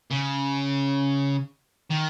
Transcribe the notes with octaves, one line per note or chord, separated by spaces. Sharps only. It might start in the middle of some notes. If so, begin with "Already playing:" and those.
C#3
D#3